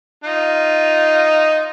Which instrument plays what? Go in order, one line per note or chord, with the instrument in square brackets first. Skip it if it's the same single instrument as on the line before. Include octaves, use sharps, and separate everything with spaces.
[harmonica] D#4 F4